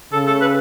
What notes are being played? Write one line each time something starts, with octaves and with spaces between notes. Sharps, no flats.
C#3 A4
A4
B4